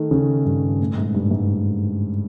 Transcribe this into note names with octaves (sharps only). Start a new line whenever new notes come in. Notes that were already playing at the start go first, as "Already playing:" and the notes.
Already playing: D#3 A3
C#3
G2
A2
G#2
G2
G#2